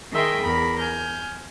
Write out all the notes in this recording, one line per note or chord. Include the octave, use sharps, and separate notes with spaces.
D#3 G#4 A#4 E5 G5 C6
E2 A#4 B5
G#5 F6 G6